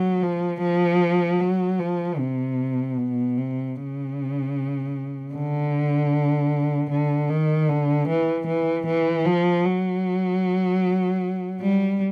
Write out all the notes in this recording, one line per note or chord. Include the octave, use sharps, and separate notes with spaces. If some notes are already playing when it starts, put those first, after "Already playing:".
Already playing: F#3
F3
F3
F#3
F3
C3
B2
C3
C#3
D3
D3
D#3
D3
E3
E3
E3
F3
F#3
G3